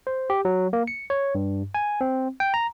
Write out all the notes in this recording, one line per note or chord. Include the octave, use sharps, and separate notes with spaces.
C5
G4
F#3
A#3
C#7
C#5
G2
G#5
C4
G5
A#5